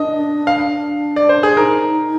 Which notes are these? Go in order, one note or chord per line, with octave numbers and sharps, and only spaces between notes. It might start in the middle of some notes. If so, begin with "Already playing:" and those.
Already playing: D4 D#5
F5
D5
C5
G#4
D#4 A#4